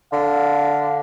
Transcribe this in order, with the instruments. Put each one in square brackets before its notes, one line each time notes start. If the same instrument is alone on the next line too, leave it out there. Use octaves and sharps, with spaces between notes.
[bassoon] D3 [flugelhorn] F5